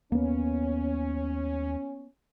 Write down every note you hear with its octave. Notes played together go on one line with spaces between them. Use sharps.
D#2 A#3 B3 C#4